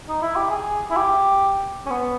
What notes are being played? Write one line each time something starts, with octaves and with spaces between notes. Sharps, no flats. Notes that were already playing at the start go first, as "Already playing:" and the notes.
D#4
E4
G4
G#4
E4
G4
C#4
B3